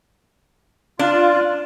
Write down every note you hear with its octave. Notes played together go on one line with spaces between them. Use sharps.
D4 F4